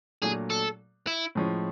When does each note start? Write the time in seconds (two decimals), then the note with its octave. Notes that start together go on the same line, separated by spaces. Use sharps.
0.22 A#2 F#3 A3 D4 G#4
0.50 A4
1.07 E4
1.35 A2 F3 G#3 C#4